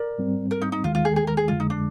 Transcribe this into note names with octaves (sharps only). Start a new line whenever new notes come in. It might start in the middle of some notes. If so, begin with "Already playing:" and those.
Already playing: A#4 D5
G#2 G3 C4
A#4
D#4
D#4
D#2 D#3 G#3 F4
F4
G#4
G#4
A#4
G#4
F2 D3 G#3 F4
D#4
D4